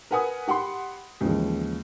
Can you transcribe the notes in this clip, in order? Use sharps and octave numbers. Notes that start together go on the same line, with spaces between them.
A#4 B4 F#5 G#5 D#6
G4 F#5 B5 C6
D#2 C#3 E3 F3 G#3